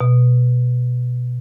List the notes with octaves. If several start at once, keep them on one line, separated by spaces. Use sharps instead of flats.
B2